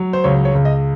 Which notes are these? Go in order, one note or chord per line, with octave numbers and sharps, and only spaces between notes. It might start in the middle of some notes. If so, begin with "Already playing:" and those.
Already playing: F#3
C5
C#2 C#5
C#5
C#2
D#5